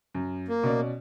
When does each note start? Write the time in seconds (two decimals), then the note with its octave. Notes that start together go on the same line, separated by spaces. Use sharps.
0.15 F#2
0.48 A#3
0.63 B2 C#4 D5